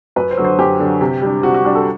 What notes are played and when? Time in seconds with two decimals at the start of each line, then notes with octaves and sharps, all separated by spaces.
0.16 F#2 B4
0.31 C5
0.38 D3 F#3
0.45 C5
0.58 F#2 G4
0.80 D3 F#3
1.01 C3
1.22 G3 D4
1.43 C3 F#4
1.54 F#4
1.65 G3 D4
1.75 A4